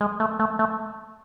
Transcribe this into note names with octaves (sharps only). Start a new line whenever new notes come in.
G#3
A3
A3
A3